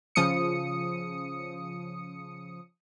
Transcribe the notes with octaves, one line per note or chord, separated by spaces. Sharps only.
C#3 F3 D#6 C#7